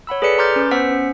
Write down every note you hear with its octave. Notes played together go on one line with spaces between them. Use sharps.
C#5 F#5 B5 E6
G#4 A4 B4 D5 B6 C#7
A#5 C6 D6 F6 G6 A6
C#4 B4
B3 C5 F#5 E6 B6
C#4